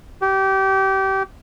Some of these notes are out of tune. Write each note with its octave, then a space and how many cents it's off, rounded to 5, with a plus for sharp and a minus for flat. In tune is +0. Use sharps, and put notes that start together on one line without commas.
G4 -25